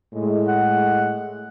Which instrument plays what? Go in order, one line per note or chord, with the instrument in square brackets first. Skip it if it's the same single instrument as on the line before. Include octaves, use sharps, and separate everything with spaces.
[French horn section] A2 G#3
[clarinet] F#5